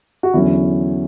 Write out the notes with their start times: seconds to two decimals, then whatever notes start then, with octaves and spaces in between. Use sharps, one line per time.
0.23 F#4
0.34 E2 D3 F#3 C#4 E4